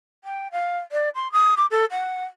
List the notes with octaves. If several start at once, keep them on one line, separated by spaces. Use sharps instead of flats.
G5
F5
D5
C6
D#6
D6
A4
F#5